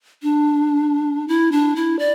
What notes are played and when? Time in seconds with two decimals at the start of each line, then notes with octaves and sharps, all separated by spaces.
0.23 D4
1.28 E4
1.52 D4
1.76 E4
1.99 D5